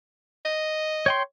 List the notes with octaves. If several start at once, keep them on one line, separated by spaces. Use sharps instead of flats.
D#5
C#5 G5 C6